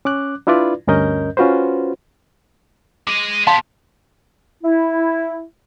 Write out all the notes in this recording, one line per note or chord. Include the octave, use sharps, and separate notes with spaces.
C#4 D6 F#6
D4 E4 F4 B4 D5
D2 G2 C#4 A#4 D#5 G6
C#4 F4 F#4 B4 C5
G#3 D#5 D6
B3 G4 F5 A5 C6
E4